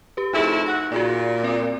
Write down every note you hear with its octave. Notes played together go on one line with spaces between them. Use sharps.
G4 B4
F2 A3 D#4 E4 G#4
F#4
A#2 F#4 G#4 D5
C4 A#4 D5